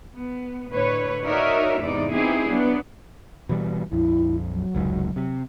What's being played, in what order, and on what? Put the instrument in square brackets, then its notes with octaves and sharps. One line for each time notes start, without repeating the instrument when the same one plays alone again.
[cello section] B3
A2 D3 B4 C#5
D#4 F#4 A#4 C#5 D5 E5
E2 G#2 C3 D#4 D5
B3 C4 D#4 E4 G4 G#4
F#3 B3 D4
[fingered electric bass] B2 E3 G3
[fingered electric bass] A#1 F2 [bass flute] E4
[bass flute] F#3
[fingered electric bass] F1 C#2 G#2
C3